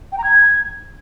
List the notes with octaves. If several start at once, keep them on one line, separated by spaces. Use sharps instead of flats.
G5
A#5
G#6